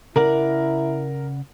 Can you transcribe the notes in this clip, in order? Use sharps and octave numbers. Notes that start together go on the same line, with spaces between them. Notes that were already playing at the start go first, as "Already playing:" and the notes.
C#3 E4 A#4 D5 F#5